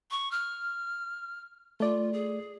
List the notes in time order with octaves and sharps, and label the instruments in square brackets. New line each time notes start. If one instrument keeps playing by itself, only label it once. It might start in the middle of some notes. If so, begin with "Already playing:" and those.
[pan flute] C#6
F6
[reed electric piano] A3 D5 [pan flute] F4
[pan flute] G#4